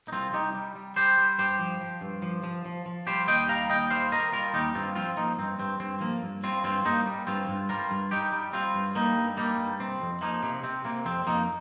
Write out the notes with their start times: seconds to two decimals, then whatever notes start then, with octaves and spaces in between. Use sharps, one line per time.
0.08 D#4
0.12 C2 C4 F4
0.33 C2 D#4 G4
0.55 G3
0.75 G3
0.96 G3 G4 C5
1.18 G3
1.38 G2 G4 C5
1.59 F3
1.81 F3
2.01 G2
2.22 F3
2.43 F3
2.65 F3
2.86 F3
3.07 G3 G4 C5
3.27 D#2 D#5 G5
3.48 G3 F5 A#5
3.70 D#2 D#5 G5
3.90 G3 C5 F5
4.11 G3 A#4 D#5
4.32 G3 F4 A#4
4.54 D#2 D#4 G4
4.75 G2 C4 F4
4.95 F3 C4 F4
5.17 F3 A#3 D#4
5.38 G2 C4
5.59 G2 C4
5.80 G2 C4
6.00 F3 A#3
6.22 G2
6.43 G3 C4 F4
6.64 G2 C4 F4
6.85 G2 A#3 D#4
7.06 G3
7.27 G2 C4 F4
7.48 G2
7.69 G3 F4 A#4
7.91 G2
8.11 G3 D#4 G4
8.32 G3
8.53 G3 C4 F4
8.74 G2
8.95 G3 A#3 D#4
9.16 G2
9.37 G3 A#3 D#4
9.59 G2
9.80 C3 C4
10.01 F2
10.21 F3 A#3 D#4
10.43 C3
10.63 C3 C4
10.85 C3 A#3
11.05 F2 C4
11.27 F2 A#3 D#4